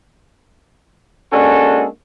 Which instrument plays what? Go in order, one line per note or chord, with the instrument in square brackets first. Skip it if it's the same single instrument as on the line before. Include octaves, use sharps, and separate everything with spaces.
[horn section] G#3 A#3 C#4 D4 F#4 A4